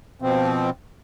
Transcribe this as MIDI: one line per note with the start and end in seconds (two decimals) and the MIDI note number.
0.22 0.70 47
0.22 0.70 53
0.22 0.70 60